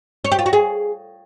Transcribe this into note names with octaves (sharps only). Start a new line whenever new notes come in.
C#5
G4
F4
F#4
G#4